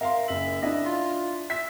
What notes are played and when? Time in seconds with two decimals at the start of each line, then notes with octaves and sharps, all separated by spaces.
0.01 A#4 E5 F5 C6
0.28 F#1 E5 F#7
0.62 D4 E4 D#5 E5
0.86 F4
1.50 E5 B6